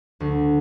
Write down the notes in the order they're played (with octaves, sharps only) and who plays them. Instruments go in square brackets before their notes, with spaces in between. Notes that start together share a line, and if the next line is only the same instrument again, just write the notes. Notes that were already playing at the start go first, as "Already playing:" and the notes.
[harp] D2